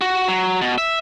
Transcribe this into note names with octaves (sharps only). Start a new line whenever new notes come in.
F#4
F#3
B2
E5